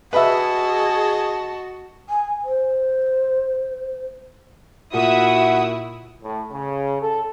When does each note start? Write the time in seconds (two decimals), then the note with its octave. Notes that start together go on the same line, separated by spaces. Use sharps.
0.13 F#4 G#4 B4 D#5 E5 A5
2.09 G#5
2.44 C5
4.93 A#2 E4 F#4 E5 F#5 D#6
6.23 A2
6.52 C#3
7.02 A4